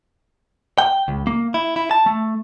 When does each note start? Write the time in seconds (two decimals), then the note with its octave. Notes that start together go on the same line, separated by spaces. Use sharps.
0.78 G5
1.08 C#2
1.27 A#3
1.54 E4
1.76 E4
1.91 A5
2.06 A3